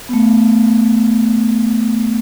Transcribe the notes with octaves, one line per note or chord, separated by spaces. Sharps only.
A3 B3